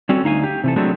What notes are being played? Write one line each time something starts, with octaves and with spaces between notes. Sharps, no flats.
G3 C4 C#4 F#4 A4
D2 D#4 F5 G#5
G4
C3 E3 A4
F#3 G#3 A3 B3 C4 D4